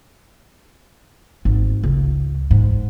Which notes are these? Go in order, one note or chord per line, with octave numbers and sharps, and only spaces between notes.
G#1
C#2
G#2